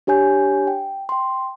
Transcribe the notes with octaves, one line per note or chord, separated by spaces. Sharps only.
D4 G4 C#5 G#5 G6
G5
G5 C6